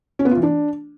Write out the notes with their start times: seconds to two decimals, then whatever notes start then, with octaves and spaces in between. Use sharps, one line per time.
0.19 C#4
0.25 B3
0.31 F4
0.37 E3
0.43 D4